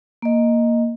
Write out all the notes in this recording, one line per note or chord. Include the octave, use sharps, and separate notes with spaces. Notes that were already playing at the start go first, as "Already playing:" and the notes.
A#3 D#5